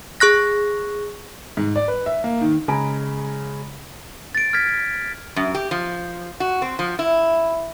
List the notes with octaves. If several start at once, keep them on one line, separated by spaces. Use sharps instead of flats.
G#4 C#6 F#6 A#6
G#2
D5
B4
E5
A#3
D#3
C#3 G#3 G#5 A#5 B5 D7
A6 D7
F6 G#6 B6
F#2
G4
F3
F#4
C4
F3
E4